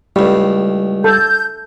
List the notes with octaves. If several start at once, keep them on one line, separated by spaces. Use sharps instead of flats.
C#2 A2 G3
A4 G6